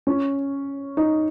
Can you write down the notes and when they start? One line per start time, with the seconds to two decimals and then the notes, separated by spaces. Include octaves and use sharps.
0.07 C#4
0.97 D#4